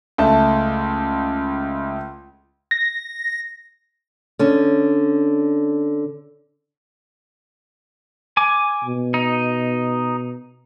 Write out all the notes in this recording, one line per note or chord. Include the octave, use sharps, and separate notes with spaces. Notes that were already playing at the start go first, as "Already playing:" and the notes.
C#2 A3 A5
A#6
D3 C#4
G#5 D6
B2
D#4